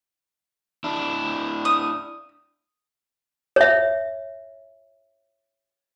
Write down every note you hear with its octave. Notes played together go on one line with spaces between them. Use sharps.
D4 E4
D#6
C#5 E5